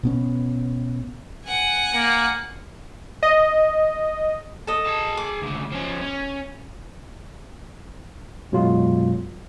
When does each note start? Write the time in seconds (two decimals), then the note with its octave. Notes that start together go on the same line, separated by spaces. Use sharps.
0.03 B2 B3 C#4
1.46 F#5 G#5
1.94 A#3
3.23 D#5
4.67 A4 D#5
4.86 G#4 A5
5.17 D6
5.42 D2 C#3
5.72 F3 C#4
6.01 C#4
8.52 F#2 B2 F#3 G#3 F4